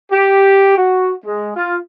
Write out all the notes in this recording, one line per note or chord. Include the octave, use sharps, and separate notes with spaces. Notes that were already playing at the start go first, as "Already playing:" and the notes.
G4
F#4
G#3
F4